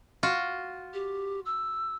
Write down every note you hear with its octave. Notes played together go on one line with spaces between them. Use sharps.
F4 F#4
G4
E6